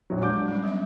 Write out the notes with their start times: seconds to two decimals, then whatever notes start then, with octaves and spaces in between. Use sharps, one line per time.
0.10 A#1 F#3
0.22 G#3 D4 D6 G6
0.48 G3 C#4
0.64 F#3 B3 E5